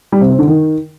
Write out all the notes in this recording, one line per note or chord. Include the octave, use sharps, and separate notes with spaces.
G3
C3
C4
D3
D#3